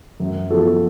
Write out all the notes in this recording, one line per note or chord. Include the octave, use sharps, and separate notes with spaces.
F#2
F3 B3 F#4 A4